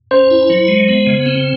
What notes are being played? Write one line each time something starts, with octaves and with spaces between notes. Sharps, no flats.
C#4 C5
E4
F#3
G#3
B3
C#3
C4